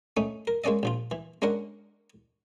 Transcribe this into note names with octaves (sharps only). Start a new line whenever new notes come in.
A3 C#4 D#4
A#4
G#3 A#3 C#4 D5 D#5
A#1 F3 F4
E3
G#3 C#4 D4 A#4 F#5